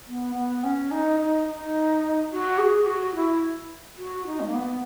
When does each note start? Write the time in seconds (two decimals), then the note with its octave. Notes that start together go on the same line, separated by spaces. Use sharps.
0.08 B3
0.36 B3
0.64 C#4
0.91 D#4
1.20 D#4
1.48 D#4
2.31 F#4
2.58 G#4
2.86 F#4
3.15 E4
3.98 F#4
4.27 D#4
4.40 G#3
4.47 A#3
4.54 B3